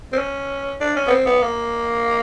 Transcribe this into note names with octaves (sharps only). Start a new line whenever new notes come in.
C4
C#4
D4
C#4
B3
C4
B3
A#3